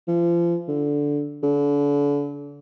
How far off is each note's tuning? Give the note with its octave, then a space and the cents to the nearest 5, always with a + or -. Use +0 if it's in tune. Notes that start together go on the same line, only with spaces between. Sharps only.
F3 -35
D3 -10
D3 -35